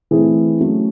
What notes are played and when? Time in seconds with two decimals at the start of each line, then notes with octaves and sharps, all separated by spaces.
0.11 E3 A3 C4 E4 G#4
0.60 F#3 A3 C#4